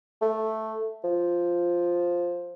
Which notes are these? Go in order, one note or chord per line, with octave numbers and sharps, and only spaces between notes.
A3
F3